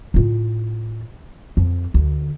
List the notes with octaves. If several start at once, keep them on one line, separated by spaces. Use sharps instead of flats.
A2 F4
F2
D2